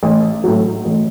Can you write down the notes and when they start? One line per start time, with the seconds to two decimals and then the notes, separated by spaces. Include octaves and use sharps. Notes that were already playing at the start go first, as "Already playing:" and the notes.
0.03 A1
0.44 A2 F#3
0.85 A1